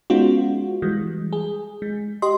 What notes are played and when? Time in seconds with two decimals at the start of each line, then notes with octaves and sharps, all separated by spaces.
0.10 G#3 B3 C#4 D#4 F4 F#4
0.82 E3 G3 G#3
1.33 G#4
1.82 G#3
2.22 G4 D#5 C6